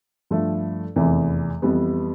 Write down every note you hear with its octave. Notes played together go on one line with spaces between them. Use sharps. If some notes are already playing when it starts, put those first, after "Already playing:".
G2 F3 A3
F1 E2 C3 E3
F2 E3 G3 B3